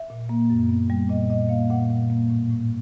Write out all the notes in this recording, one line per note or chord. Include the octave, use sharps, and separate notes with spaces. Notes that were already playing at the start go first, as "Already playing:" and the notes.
Already playing: E5
A#2
A#3
F#2
B3
G3
A#2 D#5
A#2 D#5
A#3 F5
A#2 F#5
A#2
A#3
A2
A2